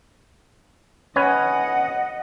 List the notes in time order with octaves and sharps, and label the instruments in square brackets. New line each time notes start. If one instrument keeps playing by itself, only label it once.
[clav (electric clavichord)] C#4 B4 G#5 [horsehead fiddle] D#5 F#5